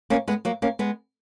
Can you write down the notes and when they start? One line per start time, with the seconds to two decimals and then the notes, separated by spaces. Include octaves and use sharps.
0.10 A#3 C#4
0.28 G#3 B3
0.45 F#3 A#3
0.62 A#3 C#4
0.79 G#3 B3